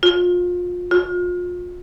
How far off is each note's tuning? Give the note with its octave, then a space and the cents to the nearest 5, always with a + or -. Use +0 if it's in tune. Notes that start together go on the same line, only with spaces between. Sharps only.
F4 +30
F4 +35